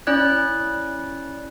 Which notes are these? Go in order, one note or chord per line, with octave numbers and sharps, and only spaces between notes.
C#4 E4 D5 F#6 G#6